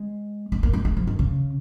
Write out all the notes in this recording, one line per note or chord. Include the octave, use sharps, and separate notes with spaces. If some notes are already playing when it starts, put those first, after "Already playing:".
Already playing: G#3
G#3
A#3
G#3
G#3
F3
D#3
C#3